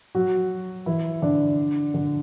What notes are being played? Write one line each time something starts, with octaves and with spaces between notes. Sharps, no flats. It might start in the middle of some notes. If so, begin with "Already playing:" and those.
F#3 F#4
E3 E4
D3 D4
D3 D4